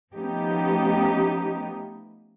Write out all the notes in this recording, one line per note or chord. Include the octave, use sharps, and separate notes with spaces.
F3 A3 B3 C#4 D#4 G4